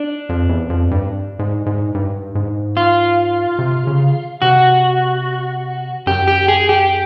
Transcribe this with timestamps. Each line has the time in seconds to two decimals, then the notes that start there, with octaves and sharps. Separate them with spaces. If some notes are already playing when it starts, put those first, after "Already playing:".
Already playing: D4
0.29 F2
0.49 E2
0.70 F2
0.91 G2
1.39 G#2
1.66 G#2
1.95 G2
2.35 G#2
2.77 F4
3.59 C3
3.87 C#3
4.42 C3 F#4
6.07 F#2 G4
6.28 G4
6.48 G#4
6.69 G4